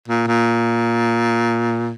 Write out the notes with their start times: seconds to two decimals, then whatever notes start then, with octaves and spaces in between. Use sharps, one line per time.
0.08 A#2
0.27 A#2